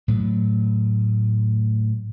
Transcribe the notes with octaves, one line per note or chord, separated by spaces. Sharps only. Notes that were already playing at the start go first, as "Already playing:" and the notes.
A2 F#3 A3